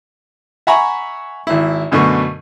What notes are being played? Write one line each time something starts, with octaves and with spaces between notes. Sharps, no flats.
E5 F#5 G#5 A#5 B5 C#6
G#1 E4
F#2 B2 D3 A3 C#6